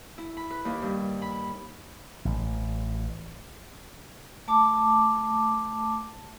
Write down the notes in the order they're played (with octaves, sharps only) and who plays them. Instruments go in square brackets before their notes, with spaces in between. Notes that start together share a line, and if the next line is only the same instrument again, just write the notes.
[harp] E4
B5
B4
D#2
G2
B5
[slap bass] A1
[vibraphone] A3 A5 D6